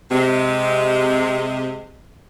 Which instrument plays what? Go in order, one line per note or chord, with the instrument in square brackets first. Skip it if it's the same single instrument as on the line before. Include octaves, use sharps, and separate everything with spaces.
[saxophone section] C3 G#3